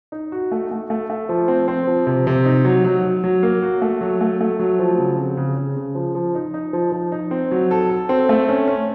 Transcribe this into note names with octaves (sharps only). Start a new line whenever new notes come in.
D#4
F#4
A3
A3
A3
A3
F3
C4
C4
F3
C3
C3
D#4
F#3
F#3
F#3
F#3
A#3
F#4
A3
F#3
A3
A3
F#3
F3
C#3
C4
C#3
C#3
C#3
F3
F3
D#4
D#4
F3
F3
D#4
C4
F#3
A4
A4
C4
A3
C#4
C#4